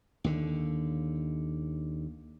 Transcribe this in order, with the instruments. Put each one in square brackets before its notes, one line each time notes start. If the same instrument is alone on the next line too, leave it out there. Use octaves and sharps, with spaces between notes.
[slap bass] D#2 D3